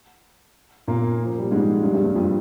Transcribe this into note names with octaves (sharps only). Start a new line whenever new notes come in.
A#2 A#3
F3
G3
G#2 G#3
G2 G3
G2 G3
G2 G3
F2 F3